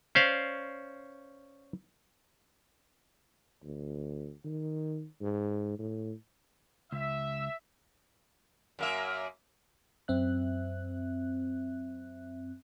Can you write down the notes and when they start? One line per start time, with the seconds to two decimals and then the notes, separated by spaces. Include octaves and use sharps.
0.15 C#4 C5 D5 F5
3.63 D2
4.45 D#3
5.21 G#2
5.79 A2
6.92 C#2 E5
8.79 F#2 A#3 E5
10.08 F#2 C4 E5 F#6